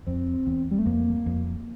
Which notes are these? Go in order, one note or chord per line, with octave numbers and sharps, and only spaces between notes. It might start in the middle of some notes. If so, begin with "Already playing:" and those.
F2 C4
E2
G3
A3
F2 A#3
F2